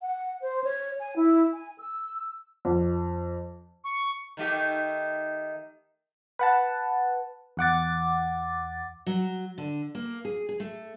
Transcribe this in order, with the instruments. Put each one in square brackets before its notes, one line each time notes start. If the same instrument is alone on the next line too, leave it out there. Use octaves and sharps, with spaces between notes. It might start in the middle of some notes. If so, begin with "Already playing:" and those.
[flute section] F#5
C5
C#5
G#5
E4
G#5
E6
[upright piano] F2
[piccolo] C#6
[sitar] D#3 A3 G4
[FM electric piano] B4 F#5 A5
E2 F#5 D6 A6
[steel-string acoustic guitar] F#3
D3
A#3
G#4
G#4
A3